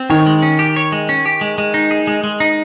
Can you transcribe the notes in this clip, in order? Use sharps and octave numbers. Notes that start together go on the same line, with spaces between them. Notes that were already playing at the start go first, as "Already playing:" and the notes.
Already playing: C4
D#3 C#5
G#3
C#4
G4
C#5
G#3
C#4
G4
G#3
G#3
D#4
G#4
G#3
G#3
D#4